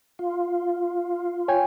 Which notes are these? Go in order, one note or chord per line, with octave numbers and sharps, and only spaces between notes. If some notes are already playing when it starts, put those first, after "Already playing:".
F4
C#5 G5 G#5